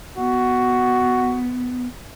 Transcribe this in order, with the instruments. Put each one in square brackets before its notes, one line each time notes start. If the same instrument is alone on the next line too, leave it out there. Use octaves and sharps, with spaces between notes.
[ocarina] B3 [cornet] F#4